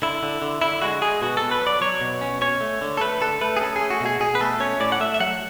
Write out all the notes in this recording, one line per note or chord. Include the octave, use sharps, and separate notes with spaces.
D3 E4
D3
D3
D3 E4
G#3 F#4
G#3 G#4
B2 F#4
B2 A4
B4
F#3
D5
F#3 C#5
B2
C#4
C#4 C#5
A3
D3
A4
A3 B4
D3 A4
A3 B4
G#4
C#4 A4
G#4
A3
F#4
B2 G#4
B2 G#4
B4
A3 A4
C#4 C#5
A2 D5
F#5
A3 E5
E5
F#3 F#5